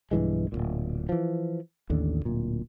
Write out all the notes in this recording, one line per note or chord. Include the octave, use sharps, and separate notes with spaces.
B1 G2 E3 G#3
D1 G#1 A#2
E3 F3
A1 D#2 D3
D1 A#2